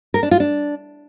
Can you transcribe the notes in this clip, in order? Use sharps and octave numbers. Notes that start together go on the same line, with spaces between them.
A#4
D4
F4
D4